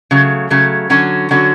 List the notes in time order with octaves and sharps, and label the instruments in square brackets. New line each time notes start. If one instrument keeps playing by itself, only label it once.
[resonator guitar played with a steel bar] C#3 F#3 A3
C#3 F#3 A3
D3 F#3 C#4 F#4
D3 F#3 C#4 F#4